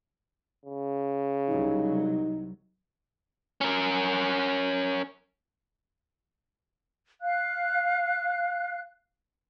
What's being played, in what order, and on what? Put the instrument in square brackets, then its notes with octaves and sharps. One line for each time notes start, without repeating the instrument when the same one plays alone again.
[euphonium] C#3
[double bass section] C2 F#3 [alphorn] D#4
[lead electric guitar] C#4 A#4
[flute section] F5 F#6